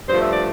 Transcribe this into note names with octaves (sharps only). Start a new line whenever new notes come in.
G2 F3 A3 C5
E5
D5